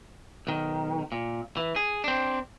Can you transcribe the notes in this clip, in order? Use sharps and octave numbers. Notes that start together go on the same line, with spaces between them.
B1 D#3
A#2
E3
G#4
C4 D4